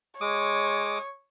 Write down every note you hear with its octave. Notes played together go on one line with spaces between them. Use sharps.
G#3 C#5 D6 D#6